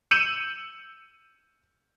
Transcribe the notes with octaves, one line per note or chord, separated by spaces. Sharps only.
E6 G6 C#7 D#7 E7 F#7